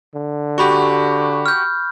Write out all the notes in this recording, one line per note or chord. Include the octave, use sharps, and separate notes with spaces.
D3
F#4 G4 B5 C#6
F6 G6